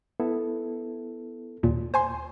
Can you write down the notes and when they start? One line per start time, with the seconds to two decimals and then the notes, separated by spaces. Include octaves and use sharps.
0.20 B3 E4 A4
1.63 D#2 A#2
1.94 C5 G#5 C6